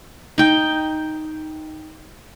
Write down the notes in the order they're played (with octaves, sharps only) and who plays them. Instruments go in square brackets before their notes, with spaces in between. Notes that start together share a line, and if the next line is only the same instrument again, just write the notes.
[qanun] D#4 G5